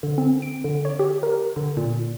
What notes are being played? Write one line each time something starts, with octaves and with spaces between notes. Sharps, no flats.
D3
C4
D7
D3
C#5
G4
A#4
D3
A#2